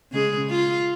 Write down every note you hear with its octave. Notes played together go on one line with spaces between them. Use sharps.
C#3 G#3 G#4
F4